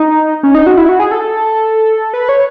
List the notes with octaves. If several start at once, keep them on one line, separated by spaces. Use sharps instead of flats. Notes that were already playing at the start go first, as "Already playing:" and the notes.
Already playing: D#4
C#4
D#4
F#4
E4
F#4
G#4
A4
B4
C#5